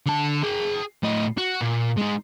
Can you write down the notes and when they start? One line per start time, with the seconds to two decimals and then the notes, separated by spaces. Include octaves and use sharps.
0.06 D3 A5
0.44 G#4 G5
1.03 A2 D#5
1.38 F#4
1.61 A#2
1.98 G#3 D#4